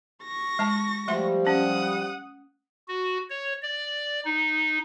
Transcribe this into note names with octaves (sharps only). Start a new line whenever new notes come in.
C#6 A#6
G#3 A5
F3 G3 A3 E5 C6
C#4 F#5 D#6
F#4
C#5
D5
D#4